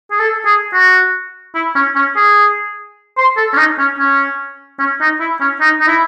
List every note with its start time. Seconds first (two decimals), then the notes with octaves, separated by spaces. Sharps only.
0.11 G#4
0.19 A4
0.46 G#4
0.73 F#4
1.55 E4
1.75 C#4
1.95 C#4
2.16 G#4
3.17 C5
3.37 A4
3.53 C#4
3.57 D#4
3.78 C#4
3.99 C#4
4.79 C#4
5.01 D#4
5.20 E4
5.41 C#4
5.61 D#4
5.81 D#4
5.88 E4